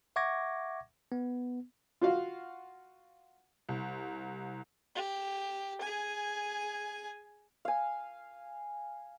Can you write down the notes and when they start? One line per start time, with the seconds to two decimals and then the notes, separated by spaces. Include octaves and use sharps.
0.16 E5 F#5 C#6 D6 G#6 A#6
1.12 B3
2.01 F4 F#4 F5
3.69 C2
4.95 G4
5.81 G#4 G#5
7.65 F5 G#5